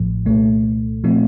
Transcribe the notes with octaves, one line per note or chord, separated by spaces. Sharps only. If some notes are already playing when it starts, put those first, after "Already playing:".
Already playing: A1 A2 F3
C2 A#2 A3
A#2 F3 A3 C4